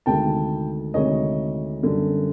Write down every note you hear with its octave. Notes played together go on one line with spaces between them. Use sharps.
D2 C3 D#3 G#3 G5 A5
D2 C3 D#3 G#3 C#5 D#5
F#2 D3 G3